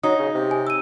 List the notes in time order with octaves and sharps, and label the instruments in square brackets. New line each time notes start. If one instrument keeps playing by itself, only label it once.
[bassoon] F#3 [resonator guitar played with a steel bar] D#4 [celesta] D#6
[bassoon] C#3
C3
[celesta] G#5
E6 D#7